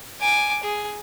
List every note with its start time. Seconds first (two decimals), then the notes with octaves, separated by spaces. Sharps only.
0.21 G#5 D6
0.63 G#4